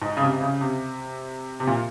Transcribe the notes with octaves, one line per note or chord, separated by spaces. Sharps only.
G#2
C#3
C3
C#3
C3
C3
A#2